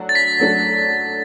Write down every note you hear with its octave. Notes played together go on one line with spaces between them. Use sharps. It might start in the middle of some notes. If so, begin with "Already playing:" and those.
Already playing: F#3 A3 D4 F#4
A6
B6
F#3 A3 D4 F#4